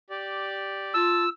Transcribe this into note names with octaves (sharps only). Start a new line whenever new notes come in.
G4 D5
F4 A5 E6